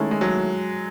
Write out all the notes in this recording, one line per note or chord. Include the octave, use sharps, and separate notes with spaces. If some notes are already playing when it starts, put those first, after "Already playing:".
Already playing: D#3 G#3 A3 C#4 E4 A4
G#3
F#3